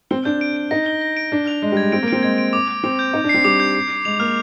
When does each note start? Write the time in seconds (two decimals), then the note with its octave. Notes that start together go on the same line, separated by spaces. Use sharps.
0.11 C4 G7
0.25 D4 G6
0.41 D7
0.56 D7
0.71 D#4 A#6
0.86 G7
1.01 A#6
1.17 D7
1.32 D4 D7
1.47 F7
1.62 G#3 F7
1.72 G3
1.77 G#6
1.83 G#3
1.92 C4 D7
2.03 A#3
2.08 C4 D7
2.23 G#3 G#6
2.38 D7
2.53 D6
2.68 D6
2.84 C4 D6
2.99 G6
3.13 D#4 D6
3.24 D4
3.29 C7
3.34 C4
3.44 G3 D6
3.60 G6
3.75 C7
3.90 C7
4.05 G#3 F7
4.19 A#3 F6